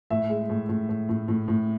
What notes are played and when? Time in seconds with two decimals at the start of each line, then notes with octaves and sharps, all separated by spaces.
0.10 A2 E5
0.29 G#3
0.49 A2
0.69 A2
0.89 A2
1.09 A2
1.28 A2
1.48 A2